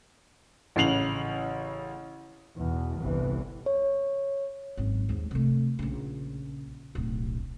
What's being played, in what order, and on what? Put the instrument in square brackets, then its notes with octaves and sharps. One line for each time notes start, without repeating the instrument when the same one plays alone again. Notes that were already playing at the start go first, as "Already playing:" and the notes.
[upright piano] A1 C#3 C7 F7 F#7
[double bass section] E2 B2
G1 C2 E3
[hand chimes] C#5
[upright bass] G#1 F#2
D#2 G#2
C3 A3
A#1 C#3
D1 B1